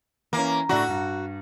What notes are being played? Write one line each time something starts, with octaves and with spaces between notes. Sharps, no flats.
E3 A#3 C#4
A2 D4 E4 F#4
G2